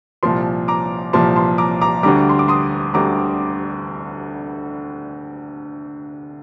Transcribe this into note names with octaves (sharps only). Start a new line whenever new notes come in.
C2 A#2 F3 A5 C6
A#5 D6
C2 A#2 F3 A5 C6
A5 C6
A#5 D6
A#5 D6
D2 D3 G3 A#5 D6
C6
D6
C6 D#6
D2 D3 G3 A#5 D6